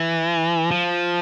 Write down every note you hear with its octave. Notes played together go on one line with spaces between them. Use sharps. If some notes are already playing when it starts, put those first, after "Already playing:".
Already playing: E3
F3